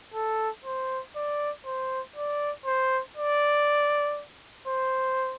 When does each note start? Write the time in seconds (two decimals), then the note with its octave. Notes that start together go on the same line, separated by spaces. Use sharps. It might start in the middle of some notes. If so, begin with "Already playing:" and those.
0.14 A4
0.65 C5
1.15 D5
1.65 C5
2.16 D5
2.66 C5
3.17 D5
4.67 C5